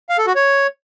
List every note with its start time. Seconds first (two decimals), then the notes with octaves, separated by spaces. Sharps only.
0.09 F5
0.18 A4
0.27 F#4
0.35 C#5